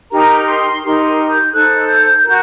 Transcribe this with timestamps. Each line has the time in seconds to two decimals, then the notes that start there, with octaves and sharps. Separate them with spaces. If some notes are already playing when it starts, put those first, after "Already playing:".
0.10 D#4 G4 A#4 A#5
0.46 C6
0.81 D#4 G4 A#4 C6
1.05 C6
1.28 G6
1.52 D#4 A4 C5 F#6
1.87 G6
2.23 F#4 A#4